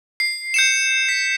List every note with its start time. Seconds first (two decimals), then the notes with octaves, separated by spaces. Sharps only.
0.20 C7
0.54 G6 C#7 E7
1.09 B6